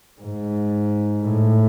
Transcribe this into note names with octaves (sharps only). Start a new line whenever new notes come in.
G#2
A2